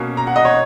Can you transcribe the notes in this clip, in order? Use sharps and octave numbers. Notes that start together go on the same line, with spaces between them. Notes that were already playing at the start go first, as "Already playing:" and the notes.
Already playing: B2 A#3 C#4
A#5
F#5
D#5
C#5